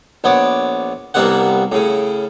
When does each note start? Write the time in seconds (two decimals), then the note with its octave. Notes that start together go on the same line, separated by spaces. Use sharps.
0.24 A#1 B3 C#5 D6
1.14 C2 G2 A#3 B3 F#5
1.72 A2 C#3